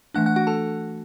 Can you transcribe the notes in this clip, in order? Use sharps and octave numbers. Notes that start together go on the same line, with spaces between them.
E3 A3 D4 F#5 F#6
F#5 F#6
F#4 F#5
A4 A5